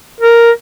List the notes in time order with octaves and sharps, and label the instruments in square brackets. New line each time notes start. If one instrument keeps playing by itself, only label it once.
[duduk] A#4